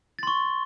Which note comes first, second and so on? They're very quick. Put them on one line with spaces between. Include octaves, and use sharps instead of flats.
A6 C6 C#6